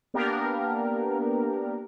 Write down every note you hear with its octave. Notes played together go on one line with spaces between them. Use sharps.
A#3 B3 D4 G4 A#4